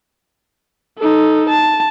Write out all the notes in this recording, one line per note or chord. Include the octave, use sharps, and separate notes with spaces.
D#4 A4
A5